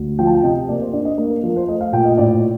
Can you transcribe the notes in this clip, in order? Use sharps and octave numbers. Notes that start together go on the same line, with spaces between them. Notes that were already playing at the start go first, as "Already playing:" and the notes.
Already playing: D2
F3 G5
A5
G5
C3 D#5
A#3 D5
C5
D4 D5
D#5
A#3
A#4
F3 A#4
C5
A3 D#5
F5
A#2 G5
D#5
A2 D5